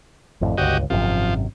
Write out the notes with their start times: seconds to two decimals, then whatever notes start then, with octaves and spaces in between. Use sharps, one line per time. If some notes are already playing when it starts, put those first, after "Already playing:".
0.41 G#1 F2 A2
0.58 G1 C#2 F#4 G4 D#5
0.90 G#1 F#2 C3 F3